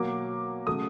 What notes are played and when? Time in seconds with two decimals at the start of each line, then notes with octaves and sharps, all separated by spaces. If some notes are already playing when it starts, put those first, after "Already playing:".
Already playing: B2 F#3 A#3 D6
0.67 C#3 F#3 A3 D#6